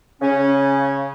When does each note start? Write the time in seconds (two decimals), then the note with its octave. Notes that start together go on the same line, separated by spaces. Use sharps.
0.22 C#3 C#4